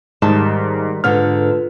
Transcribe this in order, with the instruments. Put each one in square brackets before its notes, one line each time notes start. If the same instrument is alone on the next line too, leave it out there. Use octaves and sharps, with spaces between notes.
[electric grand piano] G#2 [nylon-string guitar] D#3 G3 A5
[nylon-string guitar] G#2 D3 [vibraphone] F4 A4 B4 [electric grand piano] F6